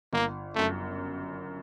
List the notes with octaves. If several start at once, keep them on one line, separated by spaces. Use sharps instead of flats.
G1 A#3
F#2 C#3 A3